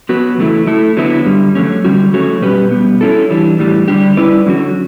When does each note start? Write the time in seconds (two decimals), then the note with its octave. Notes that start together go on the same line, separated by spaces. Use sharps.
0.09 F#3 B3 F#4 B4
0.38 E2 C#3 F#3 A3 E4
0.67 A3 E4 A4
0.97 D3 F#3 B3 E4
1.26 G2 D3 G3
1.55 F#3 A3 C#4
1.85 D3 G3 C#4 F#4
2.13 F#3 A3 C#4 F#4 C#5
2.42 B2 G3 C#4 G4 B4
2.71 B2 G3 B3
3.01 F#3 C#4 E4 A4
3.30 E3 G3 D4
3.59 A2 E3 G3
3.88 D3 G3 D4 G4
4.17 G3 C#4 E4 B4 D5
4.46 D3 F#3 C#4 F#4